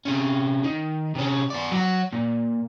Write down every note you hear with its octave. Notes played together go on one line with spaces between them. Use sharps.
C3 C#4
D#3
C3 C#4
B3 D5
F#3 F#4
A#2